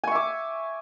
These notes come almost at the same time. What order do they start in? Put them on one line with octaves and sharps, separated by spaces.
G#5 C#6 E5 D6